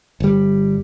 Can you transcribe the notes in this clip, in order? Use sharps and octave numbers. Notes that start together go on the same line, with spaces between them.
G1 G3